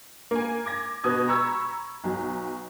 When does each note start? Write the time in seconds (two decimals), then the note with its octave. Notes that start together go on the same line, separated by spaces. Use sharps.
0.31 A#3 G#5
0.66 D6 G#6 A#6
1.04 B2 D#6 G#6
1.28 A#5 B5 C#6 E6 G#6
2.04 B1 F#3